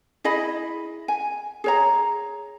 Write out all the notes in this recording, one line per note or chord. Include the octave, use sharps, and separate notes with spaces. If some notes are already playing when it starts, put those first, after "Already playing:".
E4 G#4 D#5 B5
G#5
G#4 C#5 A#5